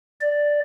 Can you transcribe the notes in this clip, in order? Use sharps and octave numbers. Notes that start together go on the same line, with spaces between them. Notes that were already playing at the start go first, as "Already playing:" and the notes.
D5